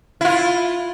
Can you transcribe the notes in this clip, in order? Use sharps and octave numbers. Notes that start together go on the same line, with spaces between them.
E4 F4